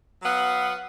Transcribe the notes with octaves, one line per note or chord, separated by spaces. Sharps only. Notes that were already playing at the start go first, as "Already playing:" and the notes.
F#3 B3 F5 F#5